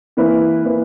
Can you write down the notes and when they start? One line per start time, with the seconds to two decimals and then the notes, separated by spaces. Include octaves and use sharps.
0.17 E3 A#3 E4 B4
0.65 E3 A#3 E4 B4